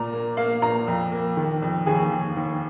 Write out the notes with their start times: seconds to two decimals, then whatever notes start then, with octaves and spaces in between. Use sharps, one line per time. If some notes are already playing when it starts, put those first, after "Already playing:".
Already playing: A#2 A#5
0.13 A#3
0.37 A#3 F5
0.62 A#2 A#5
0.88 F2
1.12 A#3
1.37 D#3
1.62 F2
1.86 D#2 G#4
2.12 D#2
2.37 D#2